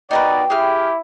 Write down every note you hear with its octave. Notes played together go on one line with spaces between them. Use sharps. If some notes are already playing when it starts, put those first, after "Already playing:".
B2 D#4 A#4 B4 D5 G5
E4 G4 G#4 F6